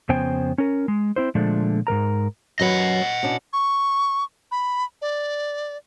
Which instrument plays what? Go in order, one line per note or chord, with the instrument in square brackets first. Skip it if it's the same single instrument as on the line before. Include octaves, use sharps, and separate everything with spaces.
[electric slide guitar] F2 C#3 B3 C5 G5 G#5
C#4 A#4
G#3
C4 E4 C5
A#2 D3 F3 G#3 A3 D4
G#2 C#3 A#4 A#5
[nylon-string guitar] F#2 F#3 B4 [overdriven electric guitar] D#5 F#5
[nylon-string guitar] B2 C#4 D4
[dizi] C#6
B5
D5